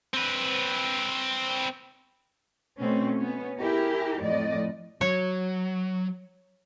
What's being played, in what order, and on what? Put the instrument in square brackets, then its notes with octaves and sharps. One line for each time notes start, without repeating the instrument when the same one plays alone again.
[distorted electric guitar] C4 B4
[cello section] B2 A3 C4 C#4
B3 C#4
E4 G4 G#4 A#4
F2 A2 D5 D#5
[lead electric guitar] F#3 [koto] C#5